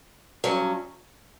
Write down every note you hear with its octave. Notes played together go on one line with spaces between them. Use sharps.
G2 F#3 C#4